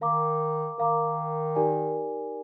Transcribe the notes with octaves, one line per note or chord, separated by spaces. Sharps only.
D#3 A#4 F5 A#5 D6
D#3 A#4 F5 A#5 D6
D#4 G4 A#4 D5 G#5